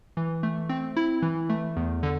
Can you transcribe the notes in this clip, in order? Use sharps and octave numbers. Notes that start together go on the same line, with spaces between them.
E3
A3
C4
E4
E3
A3
E2
D3